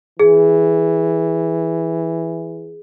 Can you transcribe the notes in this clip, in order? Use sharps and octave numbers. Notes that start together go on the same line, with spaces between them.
E3 G#4